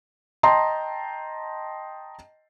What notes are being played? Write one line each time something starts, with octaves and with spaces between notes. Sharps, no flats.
D#5 G5 A5 A#5 C6